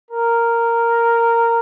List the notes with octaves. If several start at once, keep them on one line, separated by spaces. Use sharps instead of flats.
A#4